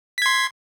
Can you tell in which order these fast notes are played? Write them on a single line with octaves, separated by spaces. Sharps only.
B6 G#6 C6